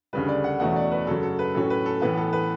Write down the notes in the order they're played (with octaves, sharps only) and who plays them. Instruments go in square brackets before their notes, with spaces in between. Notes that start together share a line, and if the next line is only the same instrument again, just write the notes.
[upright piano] D2 C#3 G3 B4
D5
F#5
E2 B2 A3 C#4 F#5
D5
B4
F#2 C#3 F#3 A4
A4
B4
A2 F#3 C#4 A4
B4
A4
A2 E3 B3 B4
A4
B4